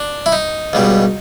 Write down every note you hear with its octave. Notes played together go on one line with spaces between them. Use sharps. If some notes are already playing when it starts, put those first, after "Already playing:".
Already playing: D4
E4
D#4
C#2 B2 G3